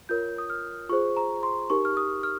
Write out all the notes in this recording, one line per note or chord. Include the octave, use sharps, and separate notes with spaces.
F4 A#4 C#5 G6
D#6
F6
F4 G#4 C5 C#6
A#5
C6
D#4 G4 A#4 C#6
F6
D#6
F6